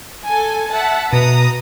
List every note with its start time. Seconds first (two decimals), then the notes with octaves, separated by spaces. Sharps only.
0.26 A4 G#5
0.74 E5 F#5 A5
1.13 B2 B4 A#5 D#6